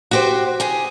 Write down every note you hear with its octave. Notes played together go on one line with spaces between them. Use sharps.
F#4 G4 C5
G4 G#4